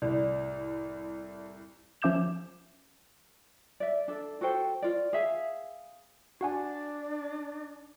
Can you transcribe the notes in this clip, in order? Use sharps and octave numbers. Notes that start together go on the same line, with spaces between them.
C2 A2 D5
F3 C#4 E5 D6 G6 E7
D5 E5
D4 A4
F#4 A4 C5 G5
F4 D5
G#4 E5 F5
D4 F#4 F#5 G#5